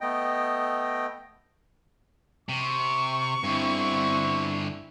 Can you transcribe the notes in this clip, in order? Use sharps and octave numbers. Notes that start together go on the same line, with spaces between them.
A3 B3 D#5 G5
C3 C#6
G2 D3 C4 E4